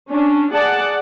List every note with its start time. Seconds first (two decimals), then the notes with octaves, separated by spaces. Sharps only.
0.10 C#4 D4
0.52 G#4 D5 F#5 A5